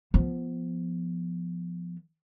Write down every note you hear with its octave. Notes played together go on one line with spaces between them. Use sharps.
F3 B3